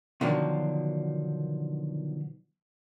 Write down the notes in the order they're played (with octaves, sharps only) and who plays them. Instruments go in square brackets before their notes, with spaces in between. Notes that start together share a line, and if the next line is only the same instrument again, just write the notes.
[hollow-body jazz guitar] B2 D3 D#3 F3 F#3 D4